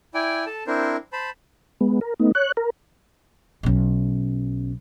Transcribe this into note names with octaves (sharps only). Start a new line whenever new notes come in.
E4 D5 G5 G#5
A4 A5
C4 D4 E4 A#4 C5
C5 A5 B5
G#3 B3
A#4
A3 B3 D#4
C#5 F#6
A#4
B1 C#4